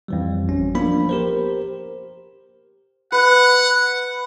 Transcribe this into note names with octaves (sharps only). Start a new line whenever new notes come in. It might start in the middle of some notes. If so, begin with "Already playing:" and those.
F2 E3 G3
G#1 C#4
F3 A#3 B3 D4 B5
G4 A#4 C5
B4 F#5